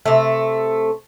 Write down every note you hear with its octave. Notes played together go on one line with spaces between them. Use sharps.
C3 A3